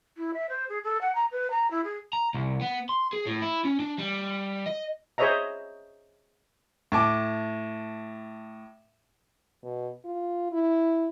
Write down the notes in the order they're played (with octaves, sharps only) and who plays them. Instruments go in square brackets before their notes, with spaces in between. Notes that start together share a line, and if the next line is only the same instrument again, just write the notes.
[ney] E4
E5
C5
G#4
A4
F#5
A#5
B4
A#5
E4
G#4
[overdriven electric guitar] A#5
C2
B3
C6
G#4
A2
E4
C#4
D4
G3
D#5
[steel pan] G#4 C5 C#5 D#5 E5 A#5
[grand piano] A2 A5 D6
[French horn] B2
F4
E4